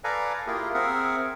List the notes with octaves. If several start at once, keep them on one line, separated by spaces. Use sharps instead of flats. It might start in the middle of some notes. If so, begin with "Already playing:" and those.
A4 B4 D5 F5 G#5 A#5
A#3 E4 F4 G4 G#4 A#4
C4 G#4 A#4 E5 F#5